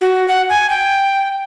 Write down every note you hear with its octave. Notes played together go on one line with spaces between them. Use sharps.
F#4
F#5
G#5
G5